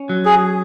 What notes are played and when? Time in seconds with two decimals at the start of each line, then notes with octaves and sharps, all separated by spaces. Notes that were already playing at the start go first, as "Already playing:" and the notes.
Already playing: C#4
0.09 F#3
0.25 G#4